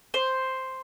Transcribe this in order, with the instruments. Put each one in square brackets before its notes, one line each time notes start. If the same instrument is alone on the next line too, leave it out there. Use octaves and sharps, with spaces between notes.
[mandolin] C5